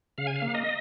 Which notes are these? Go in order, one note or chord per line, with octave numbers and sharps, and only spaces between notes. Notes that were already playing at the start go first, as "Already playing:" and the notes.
C#3 F5
G#5
F5
A#3
D#5